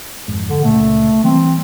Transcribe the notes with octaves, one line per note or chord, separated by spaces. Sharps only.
F1 G#2
D3
C#2 A#2 A3
E3 G3 A#3 C4